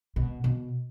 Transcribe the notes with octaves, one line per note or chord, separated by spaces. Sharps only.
B2
B2